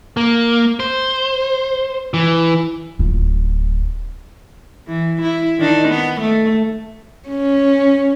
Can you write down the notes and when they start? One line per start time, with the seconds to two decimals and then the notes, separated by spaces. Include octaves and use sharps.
0.17 A#3
0.80 C5
2.14 E3
2.99 D1 F4
4.87 E3
5.22 E4
5.58 D#3 D4 D#4
5.89 B3
6.21 A3
7.29 C#4